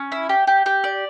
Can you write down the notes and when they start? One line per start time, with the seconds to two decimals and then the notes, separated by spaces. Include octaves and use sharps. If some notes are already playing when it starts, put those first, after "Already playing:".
Already playing: C#4
0.12 E4
0.29 G4
0.47 G4
0.66 G4
0.84 D5